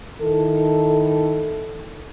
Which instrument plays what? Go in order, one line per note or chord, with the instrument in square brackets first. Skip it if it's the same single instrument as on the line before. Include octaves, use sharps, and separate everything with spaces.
[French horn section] D#3 E4 A4